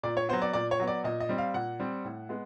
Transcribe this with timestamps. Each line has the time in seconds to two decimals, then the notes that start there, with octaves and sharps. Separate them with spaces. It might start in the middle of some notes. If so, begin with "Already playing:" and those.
0.03 A#2 D5
0.17 C#5
0.29 F#3 B3 C5
0.42 D5
0.53 A#2 D5
0.71 C#5
0.80 F#3 B3
0.87 D5
1.04 A#2 D#5
1.20 D#5
1.29 G3 C4
1.38 F5
1.54 A#2 F#5
1.80 G3 C4
2.05 A2
2.29 G#3 B3